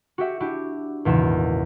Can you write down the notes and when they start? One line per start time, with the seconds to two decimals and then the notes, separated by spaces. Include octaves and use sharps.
0.18 F#4 G4 E5 F#5
0.40 D4 E4 F#4 G4
1.05 G#1 E2 A#2 C#3 E7